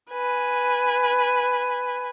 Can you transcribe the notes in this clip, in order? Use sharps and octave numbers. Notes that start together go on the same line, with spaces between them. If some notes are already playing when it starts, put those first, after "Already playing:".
B4 G#5